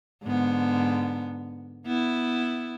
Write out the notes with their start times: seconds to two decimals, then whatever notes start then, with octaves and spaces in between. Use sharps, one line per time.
0.24 G#2 D3 B3
1.86 B3 E4